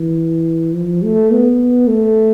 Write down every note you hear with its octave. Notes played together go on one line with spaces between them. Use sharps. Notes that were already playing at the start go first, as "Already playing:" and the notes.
Already playing: E3
F3
A3
B3
A3